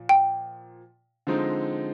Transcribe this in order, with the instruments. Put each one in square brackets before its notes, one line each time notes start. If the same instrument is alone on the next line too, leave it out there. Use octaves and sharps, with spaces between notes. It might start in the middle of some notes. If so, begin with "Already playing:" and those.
Already playing: [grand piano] A#2 F3
[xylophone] G5
[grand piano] D3 F3 G#3 C4 D#4